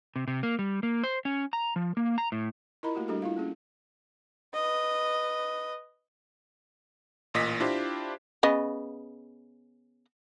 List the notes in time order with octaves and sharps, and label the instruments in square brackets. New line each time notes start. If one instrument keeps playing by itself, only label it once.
[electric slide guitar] C3
C3
A#3
G3
A#3
C5
C#4
A#5
F3
A#3
A#5
A2
[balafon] E4 F4 A#4 D#5 A#5 B5
A3 A#3 F#4 G4
G3 D4 F#4 G4 A4
E4 F4 F5
A#3 C#4 G#4
[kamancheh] B4 D#5
[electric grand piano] A1 A#2 D#5 A#6 B6
D4 E4 F4 G4 C5
[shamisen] C#3 B3 D#5